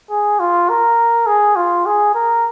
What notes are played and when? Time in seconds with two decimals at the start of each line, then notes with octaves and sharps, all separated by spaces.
0.10 G#4
0.40 F4
0.69 A#4
1.27 G#4
1.56 F4
1.86 G#4
2.15 A#4